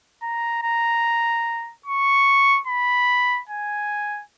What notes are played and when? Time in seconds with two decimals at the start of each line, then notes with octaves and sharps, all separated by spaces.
0.22 A#5
0.63 A#5
1.86 C#6
2.67 B5
3.49 G#5